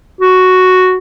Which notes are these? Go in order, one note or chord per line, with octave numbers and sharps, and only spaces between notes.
F#4